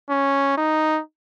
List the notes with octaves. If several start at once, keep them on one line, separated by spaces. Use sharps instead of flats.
C#4
D#4